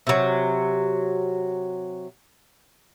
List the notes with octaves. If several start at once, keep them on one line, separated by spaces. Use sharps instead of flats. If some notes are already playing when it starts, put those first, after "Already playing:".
C3 F#3